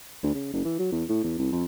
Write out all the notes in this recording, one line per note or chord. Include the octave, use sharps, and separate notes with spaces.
D2
C#3
F#1
E3
F#3
E2
A2
E2
C2
F2